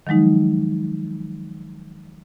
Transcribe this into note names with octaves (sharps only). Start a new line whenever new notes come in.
D#3 F3 F#3 G#3 D#4